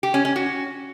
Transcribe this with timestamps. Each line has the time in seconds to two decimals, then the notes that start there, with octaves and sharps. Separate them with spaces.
0.03 G4
0.14 C#4
0.25 C#4
0.36 F#4